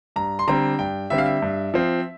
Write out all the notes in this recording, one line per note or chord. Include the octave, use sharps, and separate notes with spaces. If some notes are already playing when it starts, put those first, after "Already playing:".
G2 A#5
C6
D3 G3 C4 A#5
G2 G5
D3 G3 C4 E5
F5
E5
G2
F3 C4